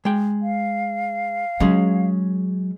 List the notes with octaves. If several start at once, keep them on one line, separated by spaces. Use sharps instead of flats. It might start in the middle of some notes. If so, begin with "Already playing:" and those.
G#3 G5
F5
F#3 G#3 C#4 G#4